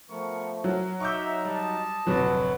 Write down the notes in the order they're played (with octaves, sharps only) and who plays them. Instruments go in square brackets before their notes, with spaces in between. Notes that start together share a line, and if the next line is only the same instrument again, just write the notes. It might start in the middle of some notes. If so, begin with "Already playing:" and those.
[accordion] F3 A3 [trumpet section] B3 A#4 C#6
[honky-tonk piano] F#3 [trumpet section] A#4
[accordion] D#4 A#5 [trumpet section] E5 [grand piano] C#6 D6 G6
[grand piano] G3 [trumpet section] D#5 A5
[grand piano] D1 F2 C3 [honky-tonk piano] F#3 [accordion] F#4 B4